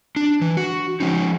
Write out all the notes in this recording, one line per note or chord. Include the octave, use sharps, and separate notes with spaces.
D4
E3
F#4
F3 C#4 D#4